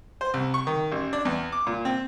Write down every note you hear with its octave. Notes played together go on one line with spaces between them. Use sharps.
C5
C2
C#6
D#3
A1
D4
E2
D6
A#2
C4